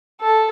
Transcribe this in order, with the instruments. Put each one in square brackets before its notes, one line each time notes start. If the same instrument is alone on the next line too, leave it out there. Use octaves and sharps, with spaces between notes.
[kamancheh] A4